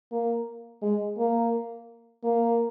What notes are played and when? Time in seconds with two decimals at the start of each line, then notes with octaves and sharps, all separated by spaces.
0.12 A#3
0.82 G#3
1.18 A#3
2.24 A#3